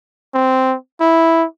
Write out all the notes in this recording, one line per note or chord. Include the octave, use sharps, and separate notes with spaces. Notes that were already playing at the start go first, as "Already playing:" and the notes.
C4
E4